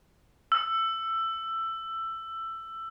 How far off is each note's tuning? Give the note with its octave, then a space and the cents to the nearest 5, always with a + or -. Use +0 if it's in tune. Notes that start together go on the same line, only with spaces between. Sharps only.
E6 +15